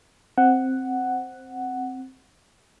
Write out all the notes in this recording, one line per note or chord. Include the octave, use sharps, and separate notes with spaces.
C4 F#5